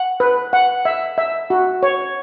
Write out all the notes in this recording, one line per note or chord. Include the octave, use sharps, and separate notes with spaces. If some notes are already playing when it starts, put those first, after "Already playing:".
Already playing: F#5
B4
F#5
E5
E5
F#4
C#5